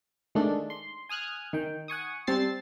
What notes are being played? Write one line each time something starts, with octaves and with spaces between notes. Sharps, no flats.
D#3 G#3 A3 D4
C6
G#5 D#6 F6 F#6 G#6
D#3 G5
F#5 G#5 C#6 D#6
G3 C4 A5 A6 C7